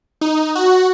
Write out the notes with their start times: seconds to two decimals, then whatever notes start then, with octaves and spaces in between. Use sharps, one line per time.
0.21 D#4
0.55 F#4